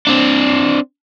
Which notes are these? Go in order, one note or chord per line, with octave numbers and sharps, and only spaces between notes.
C4 D4